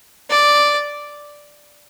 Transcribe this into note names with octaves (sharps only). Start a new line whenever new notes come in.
D5